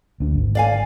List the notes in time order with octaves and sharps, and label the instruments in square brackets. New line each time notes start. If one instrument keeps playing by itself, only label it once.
[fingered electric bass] D2 D4
G#1
[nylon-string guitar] D5 F5 G#5